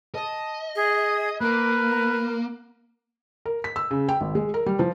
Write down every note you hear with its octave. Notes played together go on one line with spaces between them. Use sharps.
D#5 A5
G#4
A#3 A#4 B4
A#4
B6
E6
C#3
G5
G#1
G#3
A#4
G3
F3